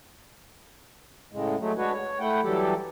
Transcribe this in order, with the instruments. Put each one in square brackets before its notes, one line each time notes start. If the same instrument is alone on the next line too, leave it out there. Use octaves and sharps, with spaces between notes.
[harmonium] A2 C#3 G#3
F#3 G#3 A3
G#3 D4 F#4 B4 C#5
C#5
A3 E4 F#5 G5
E3 F#3 G3 G4 A4